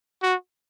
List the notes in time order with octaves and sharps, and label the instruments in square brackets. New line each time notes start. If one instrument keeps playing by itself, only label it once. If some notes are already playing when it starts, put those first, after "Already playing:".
[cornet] F#4